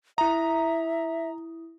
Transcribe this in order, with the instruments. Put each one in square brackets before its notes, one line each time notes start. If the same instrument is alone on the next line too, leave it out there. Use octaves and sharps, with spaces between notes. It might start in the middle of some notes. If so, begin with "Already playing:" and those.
[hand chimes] E4 D#6 [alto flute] E5 [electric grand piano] A#5